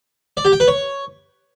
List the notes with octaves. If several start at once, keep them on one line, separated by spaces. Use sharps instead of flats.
D5
G4
G5
B4
C#5